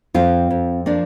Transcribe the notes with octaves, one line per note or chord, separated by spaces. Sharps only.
F2 C4 F4
F2
F3 A#3 D4